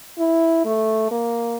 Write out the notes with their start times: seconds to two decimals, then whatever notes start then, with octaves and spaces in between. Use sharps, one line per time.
0.19 E4
0.65 A3
1.11 A#3